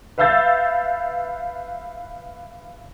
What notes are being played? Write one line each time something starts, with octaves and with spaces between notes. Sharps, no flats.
B4 E5 F5 E6 G6 A6